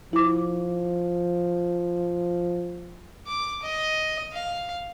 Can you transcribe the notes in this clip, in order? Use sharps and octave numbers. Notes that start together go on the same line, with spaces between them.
F3 E4 D6
D6
D#5
F5